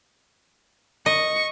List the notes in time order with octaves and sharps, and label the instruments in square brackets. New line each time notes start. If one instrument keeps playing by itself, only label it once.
[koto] D#5 [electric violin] C#6